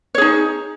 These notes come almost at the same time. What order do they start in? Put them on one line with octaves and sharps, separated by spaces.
C#5 G#4 D#4